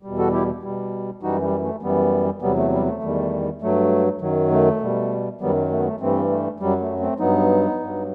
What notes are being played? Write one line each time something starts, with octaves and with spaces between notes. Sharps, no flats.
E2 B2 G3
F#4 A4
E4 G4
B2 G3
F#2 E3 G3 D#4 F#4
G3
A3
F#2 E3 G3 B3
E2 C3 F#3 G3 B3
A3
G3
A3
E2 D#3 G3
G2 F#3 A3
F#2 D#3 F#3
A3
B2 G3
F#2 D#3 F#3 G3 B3
A3
B3
A3
G2 E3 G3 A3 C4
A3
F#2 F#3 G3
A3
A3 C4
G2 F#3 B3 D#4
G2 F#3